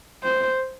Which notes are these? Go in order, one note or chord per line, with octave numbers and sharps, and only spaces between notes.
C5